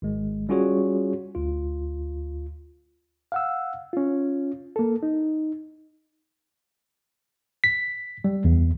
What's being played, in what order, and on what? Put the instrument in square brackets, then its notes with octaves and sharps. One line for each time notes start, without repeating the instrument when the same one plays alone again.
[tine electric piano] G#1 G#3
G3 C#4 F4 F#4 G#4 C#5
D2 F4
[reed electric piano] F5 F#5 E6
C#4 F4
A#3 A4
D#4
[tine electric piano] B6
G3
E2